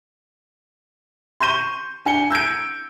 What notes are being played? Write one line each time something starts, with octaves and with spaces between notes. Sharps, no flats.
C6 C#6 G6 D#7 G7
D4 G#5 C#7 G7
E6 G6 G#6 D7